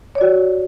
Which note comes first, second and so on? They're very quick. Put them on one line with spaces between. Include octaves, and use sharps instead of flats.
C#5 D5 F#4